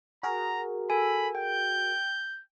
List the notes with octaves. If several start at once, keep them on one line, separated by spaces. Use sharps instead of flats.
F#4 G#4 A#4 A#5
A4 G#5 B5
G5 G6